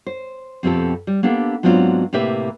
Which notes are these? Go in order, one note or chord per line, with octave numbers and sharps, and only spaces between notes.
C5
F2 B2 F3 C4 G4 A4
G3
A#3 B3 D4 G4 A4
G#2 F#3 B3 C4 D4 F4
A2 C3 A#3 G4 B4 E5